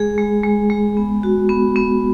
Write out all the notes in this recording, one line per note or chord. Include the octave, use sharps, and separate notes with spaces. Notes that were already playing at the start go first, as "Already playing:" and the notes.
Already playing: G#3 G#4
G#3
G#3
G#3
B3
F#4
B3
B3